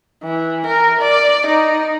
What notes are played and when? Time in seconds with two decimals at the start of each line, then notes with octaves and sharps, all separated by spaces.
0.24 E3
0.66 A#4
1.01 D5
1.47 D#4